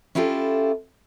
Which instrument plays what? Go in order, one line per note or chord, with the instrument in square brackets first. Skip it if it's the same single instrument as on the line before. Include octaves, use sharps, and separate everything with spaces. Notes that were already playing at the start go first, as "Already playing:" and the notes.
[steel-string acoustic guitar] C#4 E4 F4 G4 A4